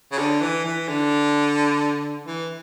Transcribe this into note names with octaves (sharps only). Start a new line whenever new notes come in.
C#3
D3
E3
E3
D3
E3